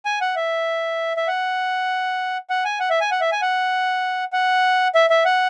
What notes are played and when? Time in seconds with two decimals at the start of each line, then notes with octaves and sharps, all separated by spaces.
0.05 G#5
0.21 F#5
0.36 E5
1.17 E5
1.28 F#5
2.50 F#5
2.65 G#5
2.80 F#5
2.90 E5
3.01 G#5
3.11 F#5
3.21 E5
3.32 G#5
3.42 F#5
4.33 F#5
4.95 E5
5.10 E5
5.25 F#5